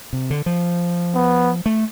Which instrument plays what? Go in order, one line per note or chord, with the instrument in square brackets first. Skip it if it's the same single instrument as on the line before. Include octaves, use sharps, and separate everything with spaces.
[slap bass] C3
D3
F3
[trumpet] B3
[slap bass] A3